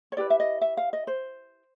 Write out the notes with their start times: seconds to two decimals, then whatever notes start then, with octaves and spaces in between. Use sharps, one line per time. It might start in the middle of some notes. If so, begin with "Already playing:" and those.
0.12 C#5
0.17 E4 G4 B4 D5
0.30 E5
0.40 D#5
0.61 E5
0.77 F5
0.93 D#5
1.07 C5